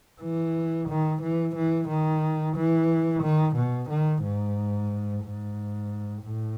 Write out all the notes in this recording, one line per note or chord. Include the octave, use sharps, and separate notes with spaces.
E3
D#3
E3
E3
D#3
E3
D#3
B2
D#3
G#2
G#2
A2